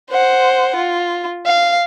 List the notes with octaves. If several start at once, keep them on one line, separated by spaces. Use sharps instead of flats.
C5 F#5
F4
F5